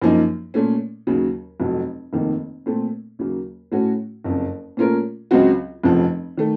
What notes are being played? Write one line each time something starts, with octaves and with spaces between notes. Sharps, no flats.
F#2 F3 A#3 D#4
A#2 A3 C#4
D#2 C#3 F#3
F1 F2 C3 F#3
F1 F2 C3 D#3 A#3
A#2 A3 C4
D#2 C#3 F#3 A#3
A2 A3 C#4 F#4
F#1 F2 C#3
A#2 A3 C#4 F4 A#4
C#2 C#3 F#3 C4 F#4
F1 F2 C#3 F3
D#3 A3